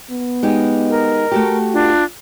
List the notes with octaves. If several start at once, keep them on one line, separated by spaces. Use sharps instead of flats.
B3
G#3 D#4 G4
A#4
A3 F#4 G4
D4 F4